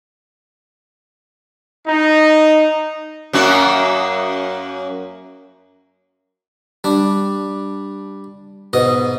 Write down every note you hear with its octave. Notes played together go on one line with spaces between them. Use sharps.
D#4
F#2 A#3 F#4
G3 D4
G#2 B2 D#5 D#6